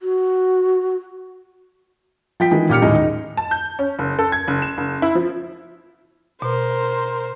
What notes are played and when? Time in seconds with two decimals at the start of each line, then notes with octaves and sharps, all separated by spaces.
0.01 F#4
2.40 F3 G5 B6
2.51 D#3 E3 G#3
2.69 A#2 G4 F6 C#7
2.82 D#2 A2 G#3 D#4
2.95 D#4
3.37 A5
3.51 G6
3.79 C#4
3.99 F#1
4.19 A4
4.32 G#6
4.48 F#1
4.62 E7
4.78 F#1
5.02 E4
5.15 F3
6.42 B2 A#4 C5